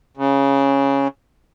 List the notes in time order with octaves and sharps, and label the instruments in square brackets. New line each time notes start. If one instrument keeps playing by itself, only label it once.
[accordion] C#3